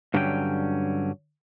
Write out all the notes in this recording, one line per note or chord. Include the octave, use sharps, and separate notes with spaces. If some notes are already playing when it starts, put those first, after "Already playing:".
G2 D3 F#3 C#4 G4 G5